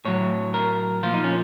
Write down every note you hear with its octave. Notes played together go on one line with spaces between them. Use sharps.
A2 F#3 C#5
A#4
A#2 F3 F4
D#4
C#4